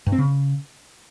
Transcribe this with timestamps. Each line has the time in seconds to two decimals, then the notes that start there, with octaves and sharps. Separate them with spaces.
0.06 G2
0.12 C4
0.18 C#3